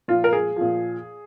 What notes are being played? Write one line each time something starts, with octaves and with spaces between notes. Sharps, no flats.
A#2 F3 F4
A#4
G#4
A#2 F3